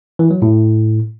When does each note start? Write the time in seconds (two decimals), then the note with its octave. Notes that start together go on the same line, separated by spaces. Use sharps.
0.19 E3
0.31 F#3
0.42 A2